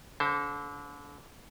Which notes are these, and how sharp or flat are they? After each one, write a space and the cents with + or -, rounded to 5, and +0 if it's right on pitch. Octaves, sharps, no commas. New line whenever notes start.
D3 -35 C5 +10